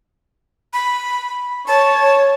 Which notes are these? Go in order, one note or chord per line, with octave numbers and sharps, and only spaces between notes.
B5
C#5 A5